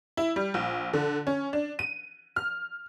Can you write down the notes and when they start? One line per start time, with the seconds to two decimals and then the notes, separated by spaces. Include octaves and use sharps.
0.17 E4
0.36 G3
0.54 A#1
0.93 D3
1.27 C#4
1.53 D4
1.79 D#7
2.36 F6